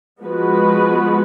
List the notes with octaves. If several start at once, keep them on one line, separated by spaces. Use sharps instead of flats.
F3 G#3 B3 F#4 B4